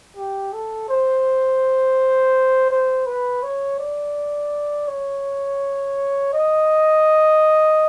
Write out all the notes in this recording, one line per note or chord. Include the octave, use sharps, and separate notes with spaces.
G4
A4
C5
C5
B4
C#5
D5
C#5
D#5